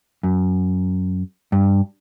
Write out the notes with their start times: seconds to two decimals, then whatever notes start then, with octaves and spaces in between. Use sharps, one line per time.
0.23 F#2
1.52 G2